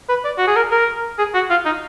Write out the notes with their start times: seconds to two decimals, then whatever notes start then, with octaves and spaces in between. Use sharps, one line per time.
0.09 B4
0.24 D5
0.38 F#4
0.47 G#4
0.56 A#4
0.72 A#4
1.19 G#4
1.34 F#4
1.50 F4
1.65 D#4